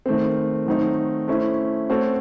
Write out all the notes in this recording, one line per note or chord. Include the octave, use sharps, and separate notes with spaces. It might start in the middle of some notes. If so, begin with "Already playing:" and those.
D#3 A3 C4
D#3 F#3 A3 C4 D#4
A3 C#4 E4 C5
A3 C4 F#4 A4 C#5